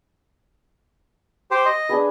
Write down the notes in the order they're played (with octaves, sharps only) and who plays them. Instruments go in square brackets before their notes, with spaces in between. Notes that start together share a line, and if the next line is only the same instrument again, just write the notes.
[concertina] G4 C5
D#5
[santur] D4 G#4 B4